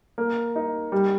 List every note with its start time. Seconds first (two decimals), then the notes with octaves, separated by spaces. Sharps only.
0.18 A#3
0.56 D#4
0.92 G3